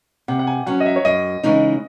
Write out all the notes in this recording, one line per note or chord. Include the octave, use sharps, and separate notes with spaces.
C3 F#5
F#5
G#5
F#3 C#4 F#5
D#5
E5
C#5
F#2 D#5
C#3 E3 G#3 D#4